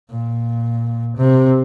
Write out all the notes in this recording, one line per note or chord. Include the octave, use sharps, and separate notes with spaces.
A#2
C3